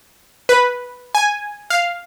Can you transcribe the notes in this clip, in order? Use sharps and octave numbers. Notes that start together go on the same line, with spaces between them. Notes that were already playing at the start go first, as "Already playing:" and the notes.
B4
G#5
F5